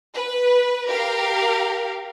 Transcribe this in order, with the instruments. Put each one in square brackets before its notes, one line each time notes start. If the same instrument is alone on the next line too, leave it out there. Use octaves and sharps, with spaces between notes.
[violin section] B4
G4 A#4 F5